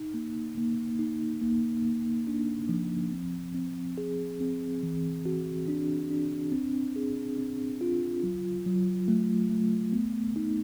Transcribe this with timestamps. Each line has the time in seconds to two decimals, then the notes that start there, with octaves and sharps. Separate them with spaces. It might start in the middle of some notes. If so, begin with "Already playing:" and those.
Already playing: D#4
0.14 A#3
0.57 A#3
0.99 D#4
1.42 A#3
1.85 A#3
2.27 D4
2.69 F3
3.12 C4
3.54 C4
3.98 G#4
4.40 C4
4.83 E3
5.26 F#4
5.68 D4
6.10 D4
6.52 C4
6.96 G#4
7.38 C4
7.81 F4
8.23 F#3
8.66 F#3
9.08 A3
9.51 A3
9.93 B3
10.36 D#4